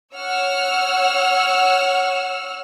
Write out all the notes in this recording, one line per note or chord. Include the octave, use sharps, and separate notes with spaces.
C#5 F#5 E6 F6